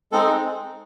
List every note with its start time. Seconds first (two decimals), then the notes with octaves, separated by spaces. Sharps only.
0.12 G#3 C4 D#4 A4
0.26 G#4